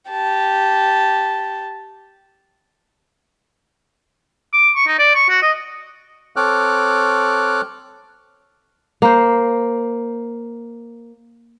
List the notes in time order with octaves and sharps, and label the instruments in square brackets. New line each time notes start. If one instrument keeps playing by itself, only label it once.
[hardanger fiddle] G4 A5
[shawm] D6
C#6
D#4
D5
C#6
F#4
D#5
[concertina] C4 A4 C#5 D6 F6 F#6
[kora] A#3 C5